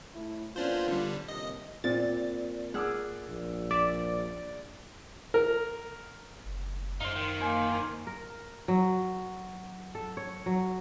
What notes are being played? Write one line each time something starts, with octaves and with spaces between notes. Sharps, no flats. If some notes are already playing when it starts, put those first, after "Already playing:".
A2 A3 E4
A#3 B3 C#4 D4 F4 C5
D3 G3
D#2 C3 D#5
A#2 C4 D5 A6
G#4 F#5 D6 E6 F6
A#1
D5 E5
A#4
F#1
F#2 D#4 C5 F5
D#3
A#3 C5 G#5
A#4
F#3
A4
C#5
F#3